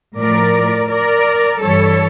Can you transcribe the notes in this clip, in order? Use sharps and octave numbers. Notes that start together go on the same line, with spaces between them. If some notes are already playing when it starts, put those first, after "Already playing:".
A2 F3 A3 A#4 D5
A#4 D5
G2 E3 G3 A4 C#5